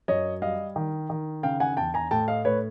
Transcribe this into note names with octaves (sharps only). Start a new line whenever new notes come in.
F#2 C#5 D#5
G3 D#5 F5
D#3
D#3
C#3 F5 G5
F#5 G#5
E2 G5 A5
G#5 A#5
A2 G5 A5
D#5 F5
A2 B4 C#5